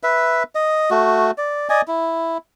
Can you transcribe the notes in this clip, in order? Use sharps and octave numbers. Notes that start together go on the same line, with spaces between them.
B4 E5
D#5
A3 F#4
D5
D5 D#5 G#5
E4